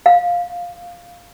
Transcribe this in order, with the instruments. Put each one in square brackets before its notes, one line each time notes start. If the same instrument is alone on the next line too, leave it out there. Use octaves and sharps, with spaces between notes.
[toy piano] F5